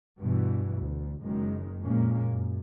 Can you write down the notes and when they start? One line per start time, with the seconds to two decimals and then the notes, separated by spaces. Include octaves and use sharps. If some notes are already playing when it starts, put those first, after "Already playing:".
0.21 G2 B2 E3
0.78 D2
1.22 F#1 F#2 D#3 G#3
1.83 F2 A#2 G#3 A#3 C#4
2.29 F#2